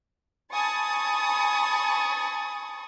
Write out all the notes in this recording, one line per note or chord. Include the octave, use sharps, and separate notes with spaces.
G#5 A5 B5 C#6 D#6 A6